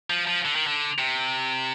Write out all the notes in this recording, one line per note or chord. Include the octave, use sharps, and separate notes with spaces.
F3
F3
D3
D#3
D3
C3